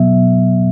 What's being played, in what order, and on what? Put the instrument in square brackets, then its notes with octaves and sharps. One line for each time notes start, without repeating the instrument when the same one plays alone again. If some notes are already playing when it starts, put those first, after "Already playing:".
Already playing: [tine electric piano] B2 F#3 B3 E5